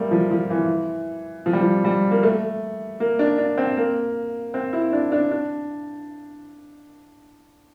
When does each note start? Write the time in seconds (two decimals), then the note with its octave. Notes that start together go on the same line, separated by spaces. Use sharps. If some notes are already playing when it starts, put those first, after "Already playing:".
Already playing: G3 A3 A#3
0.11 F3
0.31 F3
0.50 E3
1.46 F3
1.53 G3
1.61 F3
1.85 G3
2.11 A#3
2.23 A3
3.00 A#3
3.19 D4
3.38 D4
3.58 C4
3.77 A#3
4.54 C4
4.73 E4
4.93 D4
5.12 D4
5.31 D4